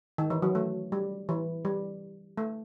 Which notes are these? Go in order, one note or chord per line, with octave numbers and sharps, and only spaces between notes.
D#3
E3
F#3
A3
G3
E3
G3
A3